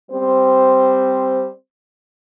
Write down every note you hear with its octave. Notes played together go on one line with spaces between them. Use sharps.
G3 C4 C5